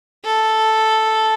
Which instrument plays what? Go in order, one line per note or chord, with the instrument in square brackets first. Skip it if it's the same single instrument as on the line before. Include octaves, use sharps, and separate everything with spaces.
[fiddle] A4